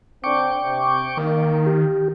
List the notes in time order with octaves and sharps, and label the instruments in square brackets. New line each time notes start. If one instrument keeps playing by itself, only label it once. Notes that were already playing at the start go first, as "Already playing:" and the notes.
[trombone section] D3 C4 D4 [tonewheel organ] G5 C#6 D6
[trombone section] C3
[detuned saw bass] D#3 [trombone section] A#3
[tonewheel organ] G4